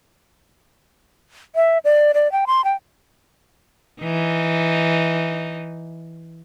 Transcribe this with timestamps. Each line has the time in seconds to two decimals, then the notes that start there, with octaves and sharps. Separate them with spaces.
1.56 E5
1.85 D5
2.14 D5
2.32 G5
2.47 C6
2.64 G5
4.02 E3 D#4